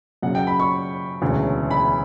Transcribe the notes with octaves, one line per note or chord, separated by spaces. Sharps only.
F#2 C#3 F#3 F#5
G5
B5
C#6
E1 D2 C#3 E3
B5